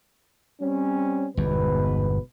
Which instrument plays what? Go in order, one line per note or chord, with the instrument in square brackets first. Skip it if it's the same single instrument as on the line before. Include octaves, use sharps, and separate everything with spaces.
[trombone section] G3 C4 C#4
[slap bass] G1 E2 [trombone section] G#2 B2 B4